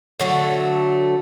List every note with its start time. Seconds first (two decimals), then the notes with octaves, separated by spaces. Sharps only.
0.20 D3 F#3 A3